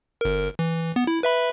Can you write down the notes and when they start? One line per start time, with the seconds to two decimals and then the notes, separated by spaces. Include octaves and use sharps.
0.21 G1 A#4
0.59 E3
0.96 B3
1.07 E4
1.23 B4 E5 B5